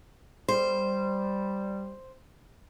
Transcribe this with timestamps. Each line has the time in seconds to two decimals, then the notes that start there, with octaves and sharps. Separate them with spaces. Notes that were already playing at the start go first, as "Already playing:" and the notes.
0.48 G3 C5